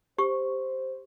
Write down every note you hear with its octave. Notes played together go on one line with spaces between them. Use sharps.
G4 C5 C#6